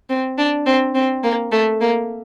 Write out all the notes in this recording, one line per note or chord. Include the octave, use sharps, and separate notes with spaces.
C4
D4
C4
C4
A#3
A3
A#3